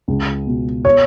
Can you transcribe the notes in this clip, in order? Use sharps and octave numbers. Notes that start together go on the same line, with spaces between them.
C#2
B2
C#5